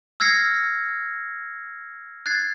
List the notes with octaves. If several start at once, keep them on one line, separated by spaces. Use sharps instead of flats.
E6 F6 G#6 A#6 C7 C#7
F#6 G#6 A6 C7